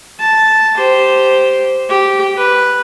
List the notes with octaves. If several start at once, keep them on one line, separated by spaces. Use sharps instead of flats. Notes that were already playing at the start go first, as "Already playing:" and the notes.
A5
G4 C5
G4
B4